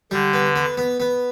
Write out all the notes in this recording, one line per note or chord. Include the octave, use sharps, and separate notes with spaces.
D3 G3
B3
B3
B3
B3